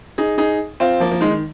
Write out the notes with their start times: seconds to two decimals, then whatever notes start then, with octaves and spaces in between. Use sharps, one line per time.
0.18 D#4 G#4
0.38 D#4 G#4
0.80 C4 F4
1.00 F3 A#3
1.11 F3 A#3
1.21 D#3 G#3
1.31 D#3